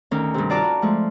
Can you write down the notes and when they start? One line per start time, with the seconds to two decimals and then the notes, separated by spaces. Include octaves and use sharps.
0.11 D2 D#3 C#4
0.34 G2 C3
0.50 F4 F#4 D5 A5 A#5 C#6
0.62 F#4
0.82 F3 G#3 A3